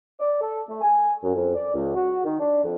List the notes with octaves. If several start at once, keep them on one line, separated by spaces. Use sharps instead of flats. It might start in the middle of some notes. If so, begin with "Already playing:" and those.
D5
A4
A3
G#5
F#2
F2
D5
C#2
F#4
D#3
D4
F2